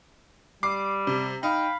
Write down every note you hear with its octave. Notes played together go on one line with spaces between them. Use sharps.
G3 D6 C7
C3
D#4 F5 G5 B5